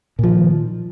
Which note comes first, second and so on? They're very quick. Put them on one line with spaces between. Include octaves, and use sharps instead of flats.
A#2 F3 D#3